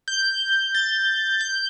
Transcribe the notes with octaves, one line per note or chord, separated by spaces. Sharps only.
G6
A6
G6